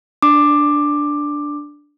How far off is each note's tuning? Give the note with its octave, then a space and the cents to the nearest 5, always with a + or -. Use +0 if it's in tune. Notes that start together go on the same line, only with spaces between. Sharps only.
D4 +0 D6 +10